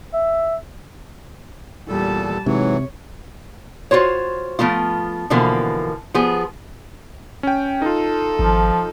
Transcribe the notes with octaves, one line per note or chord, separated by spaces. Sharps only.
E5
E2 A#2 G3 A4 A5
G#2 C3 E3 F#3 C#5
F4 F#4 C5 C#5
F3 A3 B3 F4
B2 D3 E3 F3 A#3
F3 B3 G#4
C#4 G5
D#4 F4 A4
G#1 F3